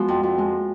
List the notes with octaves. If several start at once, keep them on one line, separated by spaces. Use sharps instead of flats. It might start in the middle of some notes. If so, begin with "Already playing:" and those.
Already playing: F3 G#3 B3 F#4
F2
F2
G#3